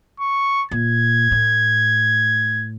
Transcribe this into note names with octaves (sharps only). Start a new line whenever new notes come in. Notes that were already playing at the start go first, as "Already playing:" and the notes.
C#6
A#2 G#6
A2